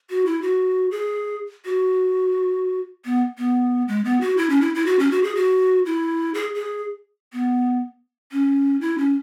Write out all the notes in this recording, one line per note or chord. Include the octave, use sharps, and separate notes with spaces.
F#4
E4
F#4
G#4
F#4
B3
B3
G#3
B3
F#4
E4
C#4
E4
E4
F#4
C#4
F#4
G#4
F#4
E4
G#4
G#4
B3
C#4
E4
C#4